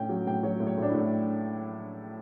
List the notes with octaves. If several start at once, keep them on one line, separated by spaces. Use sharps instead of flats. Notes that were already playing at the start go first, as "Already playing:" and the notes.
Already playing: A2 C#4 G5
F#3
A2 G5
F#3 C#5
A2
C#5
A2 D4
E4
A2